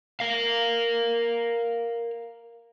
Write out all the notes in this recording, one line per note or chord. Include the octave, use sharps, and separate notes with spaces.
A#4 F5